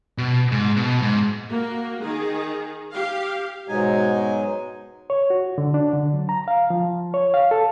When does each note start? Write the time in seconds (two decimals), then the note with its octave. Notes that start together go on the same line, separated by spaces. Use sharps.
0.18 B2
0.52 G#2
0.77 B2
1.02 G#2
1.50 A#3 F#4
2.00 D#3 G#4
2.92 G4 F5
3.68 G#2 B2 F#3 G#3 D#4 G#5
5.10 C#5
5.30 F#4
5.58 D3
5.74 D4
5.93 D3
6.13 F#3
6.29 A#5
6.48 F5
6.70 F3
7.14 C#5
7.34 F5
7.51 A4